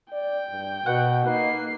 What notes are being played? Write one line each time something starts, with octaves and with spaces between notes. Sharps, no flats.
D5 G5
G2
B2 B4 F#5
A#3 D#4 B4 C7